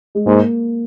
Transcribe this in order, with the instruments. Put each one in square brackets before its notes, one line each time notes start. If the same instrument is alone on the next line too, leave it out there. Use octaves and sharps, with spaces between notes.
[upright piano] G#3
[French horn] G#2 [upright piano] A#3